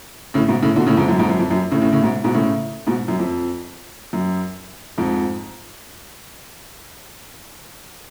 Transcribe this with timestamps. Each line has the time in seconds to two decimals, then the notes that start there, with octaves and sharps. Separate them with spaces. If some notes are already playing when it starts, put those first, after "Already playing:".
0.34 A2 C#3
0.48 G#2 B2
0.63 A2 C#3
0.76 B2 D3
0.86 A2 C#3
0.97 F2 G#2
1.08 F#2
1.18 F2 G#2
1.29 F#2
1.39 F2
1.51 F#2
1.71 A2 C#3
1.82 A2 C#3
1.93 A2 C#3
2.02 G#2 B2
2.24 G#2 B2
2.34 A2 C#3
2.87 G#2 B2
3.08 F#2
3.19 F2
4.13 F#2
4.98 F2 G#2